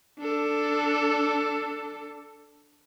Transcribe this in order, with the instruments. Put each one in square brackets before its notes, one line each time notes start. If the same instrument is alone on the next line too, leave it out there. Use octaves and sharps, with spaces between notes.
[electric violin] D4 A4